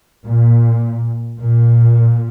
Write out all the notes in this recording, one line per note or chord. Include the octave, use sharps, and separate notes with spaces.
A#2
A#2